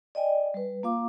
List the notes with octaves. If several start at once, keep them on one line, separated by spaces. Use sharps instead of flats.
D5 D#5 G5 G#5
G3 B4
A#3 F4 F5 D6